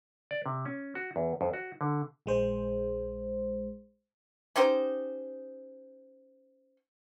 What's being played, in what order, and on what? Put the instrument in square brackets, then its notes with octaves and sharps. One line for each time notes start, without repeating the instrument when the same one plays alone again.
[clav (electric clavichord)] D5
C3
C#4
F#4
E2
F2
F#4
D3
[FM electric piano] A#1 G#3 C5
[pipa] C#4 D#4 G4 C5